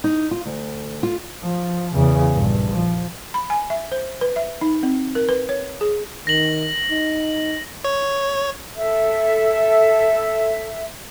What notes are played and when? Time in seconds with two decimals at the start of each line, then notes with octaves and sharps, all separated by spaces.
0.04 D#4
0.31 F4
0.46 D2
1.03 F4
1.43 F3
1.95 E2 C#3
2.32 A#1 G2
2.71 F3
3.34 B5
3.50 G#5
3.70 E5
3.92 C5
4.21 B4
4.36 E5
4.61 D#4
4.83 C4
5.15 A#4
5.29 B4
5.49 C#5
5.81 G#4
6.27 D#3 A#6 F#7
6.90 D#4
7.84 C#5
8.76 A4 E5